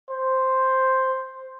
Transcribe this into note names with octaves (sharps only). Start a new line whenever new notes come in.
C5